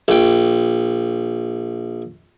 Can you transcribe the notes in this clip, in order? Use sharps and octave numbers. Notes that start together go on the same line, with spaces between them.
A#1 G5